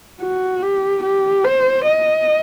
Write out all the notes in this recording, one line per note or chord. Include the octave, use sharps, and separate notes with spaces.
F#4
G4
G4
C5
D#5